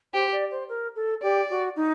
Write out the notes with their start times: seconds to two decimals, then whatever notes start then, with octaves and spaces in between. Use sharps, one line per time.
0.13 G4 C5
0.31 D5
0.50 C5
0.68 A#4
0.95 A4
1.22 G4 D5
1.50 F#4
1.76 D#4